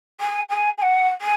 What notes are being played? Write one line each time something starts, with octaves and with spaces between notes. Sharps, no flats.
G#5
G#5
G#5
F#5
G#5